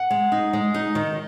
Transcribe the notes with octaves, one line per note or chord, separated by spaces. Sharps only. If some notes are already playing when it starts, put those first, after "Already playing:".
Already playing: F#5
G#3
D#4
G#3
D#4
D#3